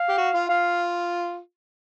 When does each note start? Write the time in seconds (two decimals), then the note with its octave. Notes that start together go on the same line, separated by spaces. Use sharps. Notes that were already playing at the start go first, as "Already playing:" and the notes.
Already playing: F5
0.09 G4
0.18 F#4
0.34 F4
0.49 F4 F5